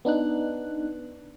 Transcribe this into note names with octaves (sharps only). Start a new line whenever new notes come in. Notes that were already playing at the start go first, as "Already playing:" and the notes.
B3 D4 D#4 F#6